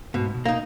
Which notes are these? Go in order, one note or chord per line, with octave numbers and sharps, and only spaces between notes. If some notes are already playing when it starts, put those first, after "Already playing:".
G#2 B2
B2
A#3 D#4